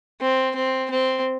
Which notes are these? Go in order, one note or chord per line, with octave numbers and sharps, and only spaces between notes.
C4
C4
C4